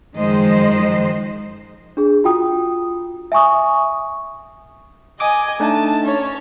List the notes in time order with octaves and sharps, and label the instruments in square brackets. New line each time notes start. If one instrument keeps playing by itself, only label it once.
[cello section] F#2 D#3 F3 G#3 C5 D#5
[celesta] D4 G#4
F4 F#4 G5 D#6
E5 G#5 C#6 D#6
[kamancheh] D#5 G#5 [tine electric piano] D6 D#6
[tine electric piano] A3 D4 D#4 [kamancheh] A5
[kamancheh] C#4 C#5